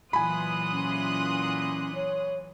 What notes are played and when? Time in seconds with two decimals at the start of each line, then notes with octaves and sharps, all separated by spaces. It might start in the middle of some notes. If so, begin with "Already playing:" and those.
0.13 A#2 E3 F#3 G#5 B5 C6 D#6 F#6
0.72 C#4
1.95 C#5